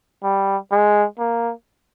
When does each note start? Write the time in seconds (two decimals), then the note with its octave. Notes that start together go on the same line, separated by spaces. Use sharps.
0.24 G3
0.72 G#3
1.19 A#3